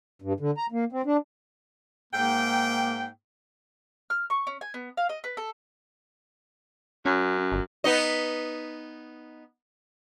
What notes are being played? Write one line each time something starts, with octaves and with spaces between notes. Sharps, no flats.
G2
D3
A#5
A#3
C4
D4
G#2 A#3 G5
F6
C#6
C#4
G#5
B3
F5
D#5
B4
A4
F#2 C#4
G1
B3 D#4 D#5